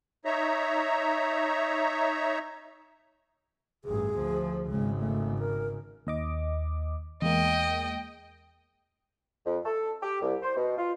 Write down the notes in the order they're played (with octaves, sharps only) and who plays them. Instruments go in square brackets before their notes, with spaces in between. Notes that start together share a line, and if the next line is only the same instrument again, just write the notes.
[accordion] D#4 C#5 E5 A#5
[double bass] A1 G2 [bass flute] G#4
[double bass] D2 F3
[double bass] G#1 C#3 [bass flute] G#3
[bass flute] A3
A#4
[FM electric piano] D#2 D#5 D6
[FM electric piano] E2 G#3 A#3 [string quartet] D#5 G5
[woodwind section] F2
A4
G4
C2
C5
B2
F4